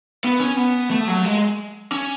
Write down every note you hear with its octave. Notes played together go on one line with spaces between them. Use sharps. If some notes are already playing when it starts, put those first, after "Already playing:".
B3
C#4
B3
A3
F#3
G#3
C#4